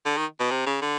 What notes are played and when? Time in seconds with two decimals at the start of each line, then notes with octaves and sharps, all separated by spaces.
0.06 D3
0.17 D#3
0.40 B2
0.51 C3
0.66 C#3
0.82 D3